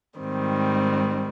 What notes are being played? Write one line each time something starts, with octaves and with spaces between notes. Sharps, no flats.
G#2 D#3 G3 C4